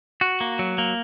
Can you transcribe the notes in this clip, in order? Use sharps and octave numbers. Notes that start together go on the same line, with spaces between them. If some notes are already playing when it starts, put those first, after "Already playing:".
F#4
A#3
F#3
A#3